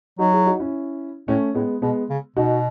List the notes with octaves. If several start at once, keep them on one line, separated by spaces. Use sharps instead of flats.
F#3 D#4 F#4
E4 G#4
D#4 F#4
C#4 E4
A2 A3 C#4
A2 G#3 B3
B2 G#3 B3
C#3
B2 D#4 F#4